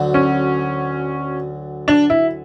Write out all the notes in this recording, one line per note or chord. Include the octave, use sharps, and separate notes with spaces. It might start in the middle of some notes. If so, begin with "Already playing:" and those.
Already playing: D2 D3 F#3
C#4
D4
E4